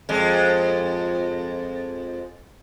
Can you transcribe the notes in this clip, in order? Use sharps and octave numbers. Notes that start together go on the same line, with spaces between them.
F2 G#3